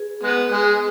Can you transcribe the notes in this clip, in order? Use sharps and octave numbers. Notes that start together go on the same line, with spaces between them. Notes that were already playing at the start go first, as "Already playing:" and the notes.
Already playing: G#4 B4
G#3 B3 G#4
G#3 B4